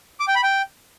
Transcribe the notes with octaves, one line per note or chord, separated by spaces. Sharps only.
D6
G5
B5
G5